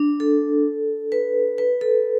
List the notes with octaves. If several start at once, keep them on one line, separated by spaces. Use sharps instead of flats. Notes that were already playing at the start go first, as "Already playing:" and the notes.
Already playing: D4
A4
B4
B4
A4